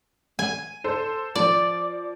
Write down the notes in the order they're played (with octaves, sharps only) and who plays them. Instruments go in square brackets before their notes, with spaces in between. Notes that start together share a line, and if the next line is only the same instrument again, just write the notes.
[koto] G#5
[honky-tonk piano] A4 C5
[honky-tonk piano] F3 [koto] D5